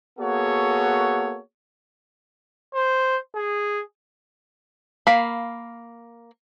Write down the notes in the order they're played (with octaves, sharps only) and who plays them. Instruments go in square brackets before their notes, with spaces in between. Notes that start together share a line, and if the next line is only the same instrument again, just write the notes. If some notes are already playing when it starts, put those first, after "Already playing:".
[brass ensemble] A#3 B3 F#4 G#4 A4 C#5
[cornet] C5
G#4
[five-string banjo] A#3 F5 B5